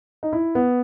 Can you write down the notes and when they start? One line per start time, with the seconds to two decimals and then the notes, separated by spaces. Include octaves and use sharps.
0.23 D#4
0.33 E4
0.55 B3